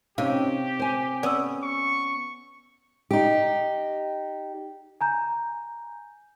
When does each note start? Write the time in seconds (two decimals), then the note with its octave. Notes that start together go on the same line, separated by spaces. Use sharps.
0.18 C3 C#4 D#4 G4 F5
0.79 C5 G#5
1.23 B3 C#4 D5 E6
1.62 C#6
3.11 D#4 G4
5.01 G#5 A#5 G6